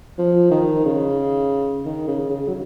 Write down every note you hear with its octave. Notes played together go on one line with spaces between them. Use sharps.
F3
D#3
C#3
D#3
C#3
C#3
F#3